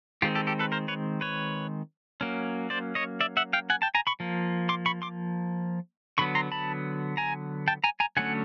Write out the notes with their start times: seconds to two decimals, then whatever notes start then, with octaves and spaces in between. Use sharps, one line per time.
0.22 D#3 G#3 C4 F4 G4
0.35 G4 A4
0.47 G4 A4
0.59 A4 B4
0.72 A#4 C5
0.88 B4 C#5
1.21 B4 C#5
2.21 F#3 A#3 C#4
2.70 C5 D5
2.95 C#5 D#5
3.20 D5 E5
3.37 E5 F#5
3.53 F5 G5
3.70 F#5 G#5
3.82 G5 A5
3.95 G#5 A#5
4.07 B5 C#6
4.20 F3 A#3
4.69 C6 D6
4.86 B5 C#6
5.02 C6 D6
6.18 D3 F#3 B3 B5 C#6
6.35 A#5 C6
6.52 A5 B5
7.17 G#5 A#5
7.68 G5 A5
7.84 G#5 A#5
8.00 G#5 A#5
8.17 D3 F#3 A3 C#4 F#5 G#5